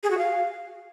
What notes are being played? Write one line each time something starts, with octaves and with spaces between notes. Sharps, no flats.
G#4
F#4
F5